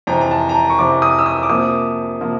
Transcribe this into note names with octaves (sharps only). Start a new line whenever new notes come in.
F2 C3 E3 A#5
A#5
A5
A#5
A5
C#6
F2 C3 E3 D6
D#6
E6
D#6
D6
C3 F3 A#3 D#6
C3 F3 A#3